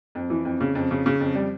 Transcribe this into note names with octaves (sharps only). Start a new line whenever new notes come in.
F2
E3
F2
C#3
F2
C#3
C#3
F2
G3